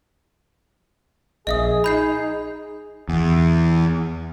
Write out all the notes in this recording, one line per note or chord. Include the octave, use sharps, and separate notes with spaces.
A#1 G#4 D#5 E5 D#6
D#4 B5 G6 C7
E2